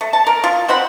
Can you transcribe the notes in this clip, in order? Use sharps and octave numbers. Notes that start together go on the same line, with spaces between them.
A3
A5
A#4
F4
C4 C5 F#5 B5